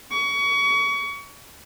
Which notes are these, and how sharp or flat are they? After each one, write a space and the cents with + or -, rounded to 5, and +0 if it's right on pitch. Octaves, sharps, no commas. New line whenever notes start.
C#6 +30